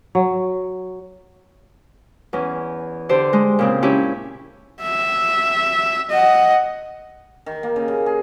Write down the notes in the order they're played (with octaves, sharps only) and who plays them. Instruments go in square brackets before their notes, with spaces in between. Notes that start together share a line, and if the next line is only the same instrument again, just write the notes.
[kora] F#3
[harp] E2 C#4
D3 G4 C5 D5
G#3
A#2 C#3 C4
C#4 D4 E4 G4
[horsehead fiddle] E5
D#5 F#5
[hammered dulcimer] D#3
A#3
C#3
C#3
G#4